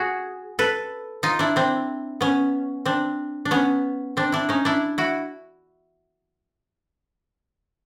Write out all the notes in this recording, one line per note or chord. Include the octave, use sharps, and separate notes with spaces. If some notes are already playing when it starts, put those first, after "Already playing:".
Already playing: F#4 G#4
A4 B4
D#4 F4
D4 E4
C4 D4
B3 C#4
C4 D4
D4
B3 C#4
C4 D4
D4 E4
C#4 D#4
D4 E4
E4 F#4